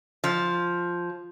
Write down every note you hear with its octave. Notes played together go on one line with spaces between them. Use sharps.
F3